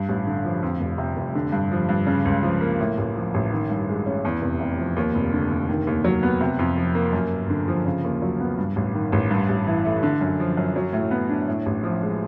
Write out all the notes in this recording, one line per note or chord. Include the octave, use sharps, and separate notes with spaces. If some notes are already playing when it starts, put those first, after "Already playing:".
Already playing: G2
A1
D3
F3
F2
F1
C3
F1
D3
G2
F3
G2
C#3
C#2
F3
A#3
A2
A1
F3
A1
D#3
G2
G#3
C#4
E2
F1
C3
F3
D#2
F1
D3
F1
D#3
D#2
F#3
B3
C3
F2
F3
A#3
F#2
G1
D3
F3
C#3
D#2
F#3
B3
G2
A1
D#3
A1
G2
A1
E3
A3
D3
F#2
F3
F#2
F#3
A2
B3
D4
A2
A1
F3
G#3